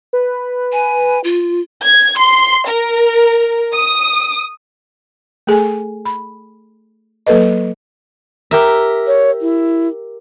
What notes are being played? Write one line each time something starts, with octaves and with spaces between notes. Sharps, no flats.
B4
G#5
F4
G#6
C6
A#4
D#6
A3 G#4 A4 G#5
B5
F#3 A#3 A4 B4 D#5
G4 A#4 E5
C#5
E4